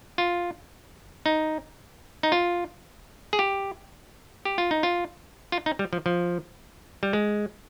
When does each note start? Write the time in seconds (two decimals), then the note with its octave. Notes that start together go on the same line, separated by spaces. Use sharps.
0.18 F4
1.26 D#4
2.23 D#4
2.32 F4
3.33 G#4
3.39 G4
4.45 G4
4.58 F4
4.71 D#4
4.83 F4
5.52 F4
5.66 D#4
5.79 G3
5.93 F3
6.06 F3
7.03 G3
7.13 G#3